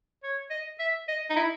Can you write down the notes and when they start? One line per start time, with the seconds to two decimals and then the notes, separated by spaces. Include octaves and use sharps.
0.23 C#5
0.50 D#5
0.79 E5
1.08 D#5
1.30 D#4
1.36 E4